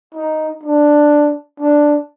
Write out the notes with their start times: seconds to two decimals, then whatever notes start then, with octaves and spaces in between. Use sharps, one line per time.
0.15 D#4
0.64 D4
1.60 D4